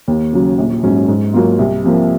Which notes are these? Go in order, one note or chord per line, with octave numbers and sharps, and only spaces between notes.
D#2
C#3 F#3
A#1
G#2 F#3 C#4
G#2
F#3 A#3 F4
C2
C3 F3 A#3